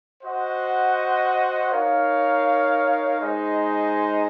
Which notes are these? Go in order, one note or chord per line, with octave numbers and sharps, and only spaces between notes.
F#4 C5 D#5 F#5
D#4 A#4 C#5 F5
G#3 D#4 G#4 C5 D#5